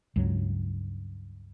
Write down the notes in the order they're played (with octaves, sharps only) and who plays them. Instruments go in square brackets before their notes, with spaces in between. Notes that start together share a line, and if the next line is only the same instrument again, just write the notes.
[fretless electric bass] C#2 G2 F#3